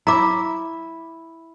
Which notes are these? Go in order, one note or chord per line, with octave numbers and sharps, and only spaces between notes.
E4 E5 A#5 D6